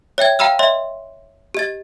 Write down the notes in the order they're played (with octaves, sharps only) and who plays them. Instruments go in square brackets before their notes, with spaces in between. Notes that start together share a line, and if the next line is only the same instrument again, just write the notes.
[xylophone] C#5 E5 G5 G#6
F5 G5 A#5 B5 E6 F6
C#5 D#5 E5 C6
G4 D#5 A6